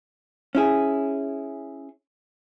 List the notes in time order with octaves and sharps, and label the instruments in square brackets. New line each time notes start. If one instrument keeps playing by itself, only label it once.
[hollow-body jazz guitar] C#4 E4 G#4